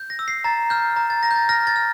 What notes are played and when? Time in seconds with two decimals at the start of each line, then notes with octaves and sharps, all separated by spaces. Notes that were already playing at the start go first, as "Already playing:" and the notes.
Already playing: G6
0.10 A#6
0.19 E6
0.28 C7
0.44 A#5 A6
0.70 F6 G6
0.96 A#5
1.10 A6
1.23 A#5 A#6
1.31 G6
1.36 A6
1.49 F6 A#6
1.67 A6
1.76 F6